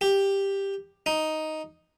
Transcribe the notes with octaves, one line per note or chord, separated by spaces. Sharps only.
G4
D#4